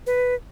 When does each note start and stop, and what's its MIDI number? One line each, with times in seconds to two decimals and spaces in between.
0.07 0.35 71